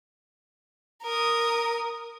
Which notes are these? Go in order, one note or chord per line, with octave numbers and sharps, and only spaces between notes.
A#4 D#6